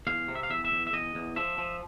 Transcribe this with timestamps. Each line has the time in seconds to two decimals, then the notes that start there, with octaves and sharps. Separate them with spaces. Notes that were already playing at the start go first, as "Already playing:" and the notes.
0.07 E2 F5
0.28 C3
0.35 E5
0.43 F5
0.50 E2 E5
0.65 E5
0.72 E2
0.87 E5
0.93 E2 D#5
1.15 E2
1.36 F3 E5
1.58 F3